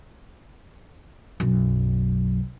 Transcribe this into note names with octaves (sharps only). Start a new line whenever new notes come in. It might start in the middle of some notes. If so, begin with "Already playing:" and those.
B1 F#2